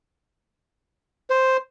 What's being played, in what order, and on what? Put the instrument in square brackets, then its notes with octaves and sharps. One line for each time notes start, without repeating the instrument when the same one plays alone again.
[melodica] C5